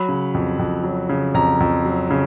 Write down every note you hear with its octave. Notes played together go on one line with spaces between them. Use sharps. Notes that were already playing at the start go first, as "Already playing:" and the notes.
Already playing: F#3 B5
C#3
F2
F2
F#3
C#3
F2 A#5
F2
F#3
C#3